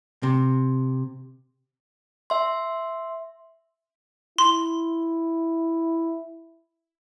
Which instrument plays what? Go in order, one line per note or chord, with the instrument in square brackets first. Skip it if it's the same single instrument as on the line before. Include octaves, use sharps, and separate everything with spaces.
[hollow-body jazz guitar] C3
[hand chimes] E5 C6
[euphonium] E4 [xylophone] C6